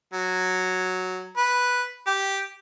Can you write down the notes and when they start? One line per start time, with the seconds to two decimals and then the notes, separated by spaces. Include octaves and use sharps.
0.13 F#3
1.37 B4
2.07 G4